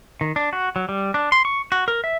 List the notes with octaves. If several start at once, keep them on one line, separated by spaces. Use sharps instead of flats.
D#3
D4
F#4
F#3
G3
D4
C6
C#6
F#4
A#4
E5